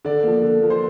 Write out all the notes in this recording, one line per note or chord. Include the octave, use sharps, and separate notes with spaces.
D3 D5
F3 A#3
D3
F3 A#3
C5